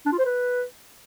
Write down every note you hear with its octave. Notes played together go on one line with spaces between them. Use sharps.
D4
F4
C5
B4